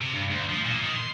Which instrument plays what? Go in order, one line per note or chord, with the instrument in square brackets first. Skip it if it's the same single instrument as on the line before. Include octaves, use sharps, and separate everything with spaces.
[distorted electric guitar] C3
G2
D2
F3
A#2
D#3
C6